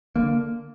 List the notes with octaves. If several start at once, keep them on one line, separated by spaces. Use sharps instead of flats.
D3 A#3